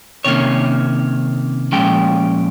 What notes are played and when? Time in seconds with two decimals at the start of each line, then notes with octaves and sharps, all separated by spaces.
0.24 C3 D#3 A#3 C#4 C#5
1.72 A#2 F3 G#3 C#4 G5